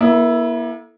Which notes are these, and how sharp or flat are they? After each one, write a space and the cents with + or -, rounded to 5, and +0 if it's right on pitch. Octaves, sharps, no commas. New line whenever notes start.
A#3 +45 E4 +0 A4 +0